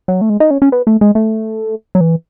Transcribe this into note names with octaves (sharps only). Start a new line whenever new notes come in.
F#3
A3
G#3
D#4
C#4
C#4
B3
A3
G#3
A3
F#3
E3